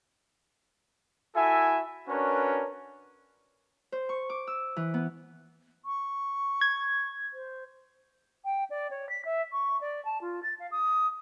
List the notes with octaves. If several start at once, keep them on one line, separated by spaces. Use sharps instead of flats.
E4 F#4 A4 E5 G#5
C#4 D4 F#4 A#4 B4 C#5
C5
C#6
D6
E6
E3
B3
C#6
G#6
C5
G5
D5
C#5
B6
E5
C#6
D5
A5
F4
A6
F5
D#6